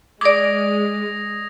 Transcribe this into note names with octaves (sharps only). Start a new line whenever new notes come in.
G#3 D5 D6 D#6 G#6 A#6